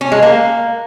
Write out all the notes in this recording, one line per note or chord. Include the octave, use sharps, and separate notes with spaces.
C#4
G#3
A#3